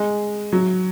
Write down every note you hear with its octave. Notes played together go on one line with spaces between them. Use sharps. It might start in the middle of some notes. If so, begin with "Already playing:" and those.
Already playing: G#3
F#3